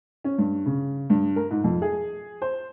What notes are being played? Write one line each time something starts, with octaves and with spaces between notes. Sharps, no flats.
C#4
G2
C#3
G2
A#4
G#2
F2
G#4
C5